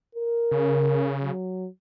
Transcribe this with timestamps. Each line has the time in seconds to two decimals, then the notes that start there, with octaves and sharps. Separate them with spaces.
0.15 A#4
0.51 C#3
1.22 F#3